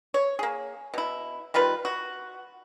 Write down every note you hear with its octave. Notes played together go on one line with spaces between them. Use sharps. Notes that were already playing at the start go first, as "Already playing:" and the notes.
C#5
A#3 G#4
B2 E4
D#3 G3 F4 B4
F#4